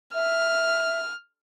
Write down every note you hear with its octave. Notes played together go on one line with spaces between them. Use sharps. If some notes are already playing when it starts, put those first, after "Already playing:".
E5 F6